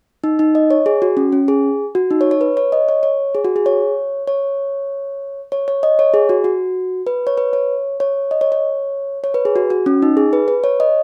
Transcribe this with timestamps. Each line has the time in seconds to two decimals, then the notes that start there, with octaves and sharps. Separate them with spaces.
0.24 D#4
0.39 D#4
0.55 D#5
0.71 C#5
0.86 G#4
1.02 F#4
1.17 C#4
1.32 C#4
1.48 G#4
1.95 F#4
2.11 D#4
2.21 C#5
2.31 C#5
2.41 B4
2.57 C#5
2.72 D#5
2.89 C#5
3.03 C#5
3.35 G#4
3.45 F#4
3.56 G#4
3.66 C#5
4.27 C#5
5.52 C#5
5.68 C#5
5.83 D#5
5.99 C#5
6.14 G#4
6.29 F#4
6.44 F#4
7.07 B4
7.27 C#5
7.38 B4
7.53 C#5
8.00 C#5
8.31 D#5
8.41 C#5
8.52 C#5
9.24 C#5
9.34 B4
9.45 G#4
9.56 F#4
9.70 F#4
9.86 C#4
10.02 D#4
10.17 G#4
10.33 B4
10.48 B4
10.64 C#5
10.80 D#5